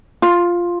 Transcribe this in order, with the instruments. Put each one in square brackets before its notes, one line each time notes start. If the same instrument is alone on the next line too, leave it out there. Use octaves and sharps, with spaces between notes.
[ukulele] F4